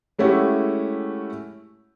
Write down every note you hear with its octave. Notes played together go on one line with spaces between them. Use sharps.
G#3 A3 C#4 E4 F#4 G4